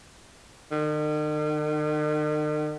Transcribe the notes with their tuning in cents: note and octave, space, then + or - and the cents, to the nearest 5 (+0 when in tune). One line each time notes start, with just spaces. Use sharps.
D#3 -45